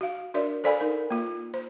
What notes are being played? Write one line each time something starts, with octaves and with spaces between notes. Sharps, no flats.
F#4 F5
D4 F#4 A#4 C#5 D5 E5
A4 C5 D5 F5 G#5 B5
D#4 A#4
A#3 F4
C5